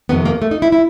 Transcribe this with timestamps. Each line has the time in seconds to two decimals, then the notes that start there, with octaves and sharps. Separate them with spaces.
0.09 F2 C3 D#3 B3
0.25 A#3
0.42 A3
0.51 D#4
0.62 E4
0.72 E4